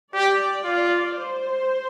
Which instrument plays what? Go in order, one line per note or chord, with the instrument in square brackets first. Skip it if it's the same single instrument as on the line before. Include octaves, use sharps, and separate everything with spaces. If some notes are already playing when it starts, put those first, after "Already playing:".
[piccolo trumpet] G4 [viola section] D5
[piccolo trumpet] F4
[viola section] C5